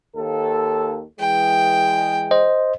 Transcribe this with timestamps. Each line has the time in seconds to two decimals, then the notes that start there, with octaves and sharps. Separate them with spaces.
0.16 D#2 A4
1.20 E3 G#3 G5
2.31 C5 D#5